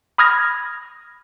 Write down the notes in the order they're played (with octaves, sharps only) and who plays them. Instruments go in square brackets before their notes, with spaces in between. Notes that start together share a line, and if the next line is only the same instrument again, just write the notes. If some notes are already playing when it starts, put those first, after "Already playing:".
[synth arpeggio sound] B5 D#6 F6 G#6 A#6